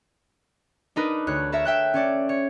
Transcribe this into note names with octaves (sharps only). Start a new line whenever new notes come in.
D4 D#4 A#4 B4
D2 C#5 F#6
A4 A#4 C#5 E5
E5 G5 F#6
C#4 C#5 D5
C#5